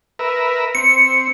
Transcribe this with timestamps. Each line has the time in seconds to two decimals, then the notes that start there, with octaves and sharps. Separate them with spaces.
0.19 A#4 B4 E5
0.75 C4 C#7